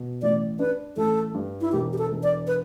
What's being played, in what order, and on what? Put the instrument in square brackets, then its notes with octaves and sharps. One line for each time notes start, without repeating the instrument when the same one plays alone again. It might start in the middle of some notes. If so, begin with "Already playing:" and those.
Already playing: [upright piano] B2
[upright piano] A1 [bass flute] D5
[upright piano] D4 [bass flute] B4
[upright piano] A1 [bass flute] A4
[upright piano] G2
[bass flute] E4
[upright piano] E1 [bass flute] G4
[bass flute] G4
A4
[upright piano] E1
[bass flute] D5
B4